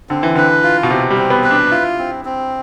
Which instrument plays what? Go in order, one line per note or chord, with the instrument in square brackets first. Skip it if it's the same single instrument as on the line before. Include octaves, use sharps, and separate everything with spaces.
[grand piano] D3 [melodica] C4
[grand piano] E3
[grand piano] D3 [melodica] B4
[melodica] F4
[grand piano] B2
[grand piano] C3 [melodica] C4
[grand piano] G3
[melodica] C4
[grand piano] B3
[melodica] B4
[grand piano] D4
[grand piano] E4 [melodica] F4
[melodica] C4
C4